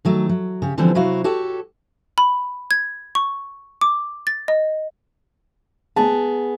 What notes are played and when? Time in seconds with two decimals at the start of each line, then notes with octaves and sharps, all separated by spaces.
0.05 D#3 F#3 A3
0.29 F#3
0.62 C#3 G4
0.78 D3 E3 F3 G3 B3 C4
0.95 C3 F#3 E4 F#4 F5
1.24 F#4 G4 A4 C#5 G5
2.18 B5
2.71 G#6
3.15 C#6
3.81 D6
4.27 A6
4.48 D#5
5.96 B3 G#4 A5